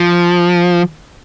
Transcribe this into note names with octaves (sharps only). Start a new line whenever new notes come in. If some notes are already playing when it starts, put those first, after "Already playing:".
Already playing: F3